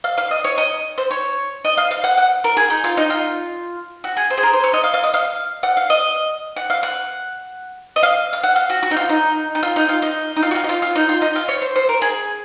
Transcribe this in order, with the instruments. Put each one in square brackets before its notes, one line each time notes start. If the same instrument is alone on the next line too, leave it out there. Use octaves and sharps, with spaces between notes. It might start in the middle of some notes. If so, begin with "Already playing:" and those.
[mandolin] F5
F5
D#5
C#5
D#5
C5
C#5
D#5
F5
F5
F#5
F#5
A#4
G#4
D#4
F4
D#4
F4
F#4
G#4
C5
G#4
A#4
C5
C#5
D#5
F5
F5
D#5
F5
F#5
F5
D#5
F#5
F5
F#5
D#5
F5
F5
F#5
F5
F#4
F#4
D#4
F4
D#4
D#4
F4
D#4
F4
D#4
D#4
F4
F#4
F4
D#4
F4
F4
D#4
F4
D#4
F4
C#5
C5
C5
A#4
G#4